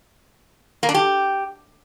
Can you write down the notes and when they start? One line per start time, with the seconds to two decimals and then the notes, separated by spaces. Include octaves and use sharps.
0.83 A#3
0.89 D4
0.94 G4